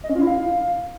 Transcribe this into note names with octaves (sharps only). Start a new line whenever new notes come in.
D#5
C#4
F4
E4
F5